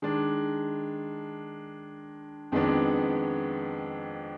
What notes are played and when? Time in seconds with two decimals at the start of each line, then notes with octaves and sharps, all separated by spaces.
0.02 D#3 G#3 D4
2.52 F2 D#3 G#3 B3 D4